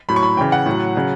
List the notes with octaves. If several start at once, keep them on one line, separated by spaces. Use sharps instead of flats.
A2 F#3 B5
C#6
B5
C#3 E3 G5
F#5
A2 F#3
C#3 F#3